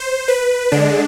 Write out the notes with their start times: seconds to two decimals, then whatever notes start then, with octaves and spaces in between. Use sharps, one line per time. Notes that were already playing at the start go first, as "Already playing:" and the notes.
Already playing: C5
0.28 B4
0.72 D3 G#3 D4